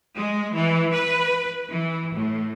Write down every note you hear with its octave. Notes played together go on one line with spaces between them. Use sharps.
G#3
E3
B4
E3
A2